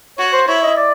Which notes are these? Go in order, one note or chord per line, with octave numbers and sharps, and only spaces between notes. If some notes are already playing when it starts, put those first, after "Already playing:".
F#4 C#5
C5
E4 C#5
D#5
D5